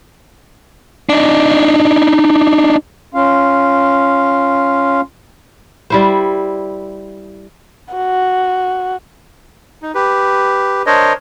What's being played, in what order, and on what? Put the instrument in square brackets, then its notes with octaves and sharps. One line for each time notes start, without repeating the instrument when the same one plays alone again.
[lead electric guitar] D4 D#4
[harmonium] C#4 F4 F5
[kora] G3 E4 C5
[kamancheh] F#4
[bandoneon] D#4
G4 B4
D4 A#4 C5 C#5 D#5